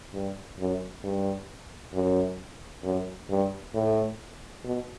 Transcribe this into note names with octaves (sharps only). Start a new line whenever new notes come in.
G2
F#2
G2
F#2
F#2
G2
A2
B2